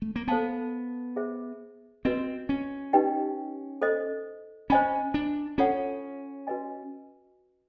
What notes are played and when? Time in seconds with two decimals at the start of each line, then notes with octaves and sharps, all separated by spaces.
0.02 A3
0.16 A#3
0.28 B3 A4 C5 F5 A5
1.16 G#4 C5 E5
2.05 C4 F#4 B4 D#5
2.49 C#4
2.93 D#4 G4 B4 D#5 G5
3.82 A4 C5 D#5
4.70 C#4 C5 D#5 G#5 B5
5.14 D4
5.58 C#4 F4 A4 C#5 F#5
6.47 F#4 B4 D#5 G#5